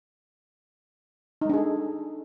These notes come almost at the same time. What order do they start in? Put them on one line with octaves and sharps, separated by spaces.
D#4 G#3 D4 G#4 A4